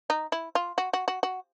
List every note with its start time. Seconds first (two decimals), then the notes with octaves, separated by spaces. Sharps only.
0.10 D#4
0.32 E4
0.55 F4
0.78 F#4
0.93 F#4
1.08 F#4
1.23 F#4